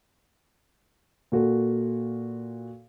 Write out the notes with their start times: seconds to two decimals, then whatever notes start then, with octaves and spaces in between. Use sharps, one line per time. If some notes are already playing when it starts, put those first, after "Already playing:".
1.32 A#2 F#4 A4